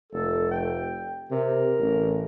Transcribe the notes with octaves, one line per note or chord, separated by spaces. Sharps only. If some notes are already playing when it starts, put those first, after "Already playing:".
F1 A4
G5
C3 A#4
A1